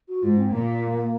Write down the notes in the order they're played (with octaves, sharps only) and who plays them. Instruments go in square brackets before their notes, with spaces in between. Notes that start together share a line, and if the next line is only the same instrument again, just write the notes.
[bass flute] F#4
[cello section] G#2 [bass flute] F4
[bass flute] C4
[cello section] A#2 [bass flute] A#3